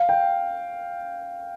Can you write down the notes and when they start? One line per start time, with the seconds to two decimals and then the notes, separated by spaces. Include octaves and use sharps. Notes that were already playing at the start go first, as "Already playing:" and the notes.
Already playing: F5
0.09 G5